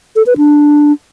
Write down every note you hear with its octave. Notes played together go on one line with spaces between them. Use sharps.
A4
B4
D4